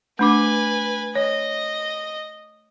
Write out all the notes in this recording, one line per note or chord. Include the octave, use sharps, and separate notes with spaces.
A3 D4 B4 G#5 D6
C#5 D#5